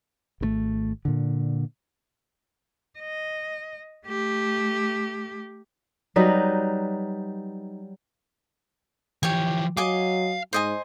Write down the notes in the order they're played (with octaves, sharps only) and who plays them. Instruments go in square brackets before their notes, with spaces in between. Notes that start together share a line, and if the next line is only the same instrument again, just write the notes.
[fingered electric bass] G#1 C3 A3
A#2 D3
[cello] D#5
A3 G4
[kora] F#3 G3 D#4 B4
[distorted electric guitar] E3 F3 [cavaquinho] G4 C#5 G#5
[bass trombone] F#3 [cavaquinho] D#5 G#5 D6 [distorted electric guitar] F5
[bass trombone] G#2 [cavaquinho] C5 D#5 G#5